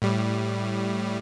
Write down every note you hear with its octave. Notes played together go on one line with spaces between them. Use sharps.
A2 G3